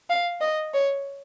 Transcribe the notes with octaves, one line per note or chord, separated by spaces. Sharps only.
F5
D#5
C#5